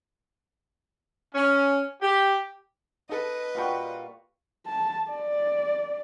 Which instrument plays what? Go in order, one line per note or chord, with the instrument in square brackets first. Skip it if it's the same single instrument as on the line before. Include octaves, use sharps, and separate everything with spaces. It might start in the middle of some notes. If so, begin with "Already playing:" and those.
[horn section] C#4
G4
[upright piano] D#4 A4 [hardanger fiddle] B4 D#5
[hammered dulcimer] A#2 G3 C#6 [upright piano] F4 F#4 G5
[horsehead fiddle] A5
D5